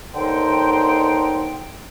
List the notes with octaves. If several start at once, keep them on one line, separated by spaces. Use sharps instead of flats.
D#2 D3 D#4 C5 G5